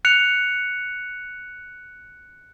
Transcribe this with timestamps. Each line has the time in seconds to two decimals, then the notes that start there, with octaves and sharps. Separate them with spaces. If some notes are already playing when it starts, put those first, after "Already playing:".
0.05 F#6 C#7 F7